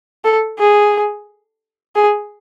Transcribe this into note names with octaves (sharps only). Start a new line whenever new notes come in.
A4
G#4
G#4